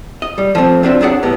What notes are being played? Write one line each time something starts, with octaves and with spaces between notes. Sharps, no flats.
D#5
G3
F3 A3 C4
C4 D4 F4 F#4 E5
F#3 C4 D4 G#4 D5 F#5
C2 A2 B3 G4